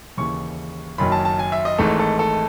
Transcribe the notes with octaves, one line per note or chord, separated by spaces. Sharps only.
D#2 C#3 E3 C#6
F#1 F#2 D#3 F#3 B5
A5
A5
G#5
E5
D#5
G#1 G#2 E3 A3 A4
A4
A4